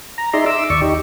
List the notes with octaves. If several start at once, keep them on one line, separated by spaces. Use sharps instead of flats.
A#5
D#4 G#4 D5 E5 A#5 C6
E5 D6 E6
D#2 D5 C#6
D#4 G4